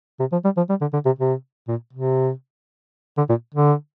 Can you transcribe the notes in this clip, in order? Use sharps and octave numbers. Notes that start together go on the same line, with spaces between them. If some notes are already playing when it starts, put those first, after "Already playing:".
C3
F3
G3
F3
G3
D3
D3
C3
C3
A#2
C3
D3
A#2
D3